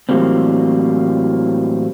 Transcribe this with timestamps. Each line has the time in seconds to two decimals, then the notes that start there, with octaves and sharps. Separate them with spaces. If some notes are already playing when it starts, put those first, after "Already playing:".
0.09 A2 E3 F#3 G3 A#3 C4